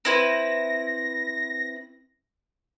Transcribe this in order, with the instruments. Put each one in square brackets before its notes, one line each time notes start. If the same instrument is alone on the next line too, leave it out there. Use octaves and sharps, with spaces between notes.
[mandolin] C4 E4 B4 [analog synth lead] A#6